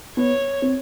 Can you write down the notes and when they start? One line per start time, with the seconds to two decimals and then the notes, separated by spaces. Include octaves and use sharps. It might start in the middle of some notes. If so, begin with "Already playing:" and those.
0.17 B3 C#5
0.62 C4